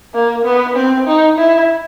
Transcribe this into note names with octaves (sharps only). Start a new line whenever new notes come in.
A#3
B3
C4
D#4
E4